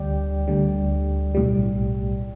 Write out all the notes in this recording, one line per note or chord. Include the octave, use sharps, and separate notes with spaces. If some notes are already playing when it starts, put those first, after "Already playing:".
Already playing: D2 D3 G3 D5 G5
D2 D3 G3
B1 A2 G3